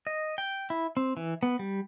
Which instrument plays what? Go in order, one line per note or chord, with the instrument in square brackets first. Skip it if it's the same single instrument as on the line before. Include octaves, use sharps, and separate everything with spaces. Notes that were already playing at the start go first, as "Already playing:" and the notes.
[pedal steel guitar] D#5
G5
E4
C4
E3
B3
G3